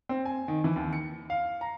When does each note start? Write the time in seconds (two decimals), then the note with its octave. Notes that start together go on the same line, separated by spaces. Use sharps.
0.09 C4
0.25 G#5
0.48 D#3
0.64 E3
0.76 D#2
0.93 C#7
1.30 F5
1.61 A#5